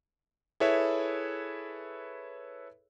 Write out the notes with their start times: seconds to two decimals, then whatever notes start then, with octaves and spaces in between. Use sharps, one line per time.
0.60 E4 G#4 A4 B4 C#5 E5